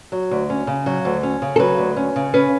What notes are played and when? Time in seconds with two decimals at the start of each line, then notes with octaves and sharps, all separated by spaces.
0.12 F#3
0.31 D2
0.50 C#4
0.67 C#3
0.86 F#3
1.05 D2
1.23 C#4
1.42 C#3
1.56 A4
1.59 F#3 B4
1.78 D2
1.97 C#4
2.16 C#3
2.34 C#4 B4